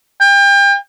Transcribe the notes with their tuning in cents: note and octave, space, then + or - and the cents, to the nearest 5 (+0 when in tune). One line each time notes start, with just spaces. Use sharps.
G5 +35